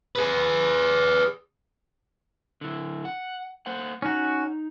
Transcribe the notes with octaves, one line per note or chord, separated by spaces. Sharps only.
G#4 B4
D3 E4
F#5
A#3 C5 F#5
C#4 D#4 F#4